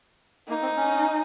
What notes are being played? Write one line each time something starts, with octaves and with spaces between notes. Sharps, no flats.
A#3 D#4
C4
C#4